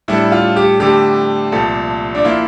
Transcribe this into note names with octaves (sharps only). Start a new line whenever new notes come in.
A2 G3 D4 E4 A4
F4
G4
F2 D3 A3 G4
C2 A#2 F3 A4
D4
F3 A#3 E4 F4